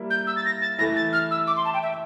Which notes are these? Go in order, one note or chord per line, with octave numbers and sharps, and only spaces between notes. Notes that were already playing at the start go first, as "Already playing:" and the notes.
Already playing: G3 A#3 E4
G6
E6
A6
A#6
A6
E3 A3 E4 A#6
A6
F6
E6
D6
C6
A5
G5
E5